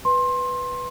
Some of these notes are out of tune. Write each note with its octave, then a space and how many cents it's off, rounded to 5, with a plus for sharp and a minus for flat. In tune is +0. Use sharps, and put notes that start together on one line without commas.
B4 +0 C6 +20